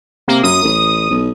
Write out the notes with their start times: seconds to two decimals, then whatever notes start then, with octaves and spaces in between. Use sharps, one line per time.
0.28 C3 A#3
0.43 F#2 D#6
0.64 A1
1.11 B1